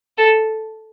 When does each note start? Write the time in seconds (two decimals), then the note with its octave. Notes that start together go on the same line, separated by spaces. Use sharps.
0.18 A4